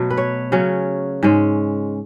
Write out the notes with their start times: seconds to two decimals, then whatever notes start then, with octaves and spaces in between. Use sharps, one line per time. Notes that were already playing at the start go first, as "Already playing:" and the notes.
Already playing: B2 F#3 A3
0.10 B4
0.17 C#5
0.52 C#3 F#3 C#4
1.23 G#2 G#3 C#4